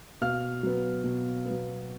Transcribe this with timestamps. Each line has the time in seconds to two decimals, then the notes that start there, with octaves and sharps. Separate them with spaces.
0.21 B2 F5 F6
0.63 F#3 B3
1.04 B2
1.45 B3
1.50 F#3